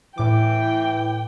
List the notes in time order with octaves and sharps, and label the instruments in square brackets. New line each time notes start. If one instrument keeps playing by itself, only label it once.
[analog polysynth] A2 D6 [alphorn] E3 [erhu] G5